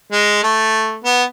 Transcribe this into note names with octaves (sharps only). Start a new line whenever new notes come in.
G#3
A3
B3